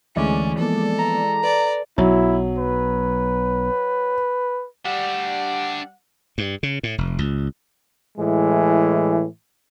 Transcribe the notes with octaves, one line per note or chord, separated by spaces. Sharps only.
D2 D3 E3 G#3 A3 C#4 D5
F3 A#3 B3 A4
A#5
B4 D5
B1 F#3 E4
B4
G3 D4 E5 F#5
G2
C#3
A2
F1
C#2
A2 E3 G#3